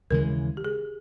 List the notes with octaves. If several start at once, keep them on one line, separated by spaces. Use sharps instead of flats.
D#2 C#3 E3 G#3 A#4
G4
G#4